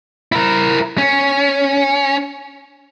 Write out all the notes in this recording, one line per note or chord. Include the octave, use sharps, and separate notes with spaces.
E4 A#4
C#4